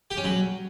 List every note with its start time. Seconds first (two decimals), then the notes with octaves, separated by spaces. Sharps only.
0.11 G4
0.17 C#4
0.24 F#3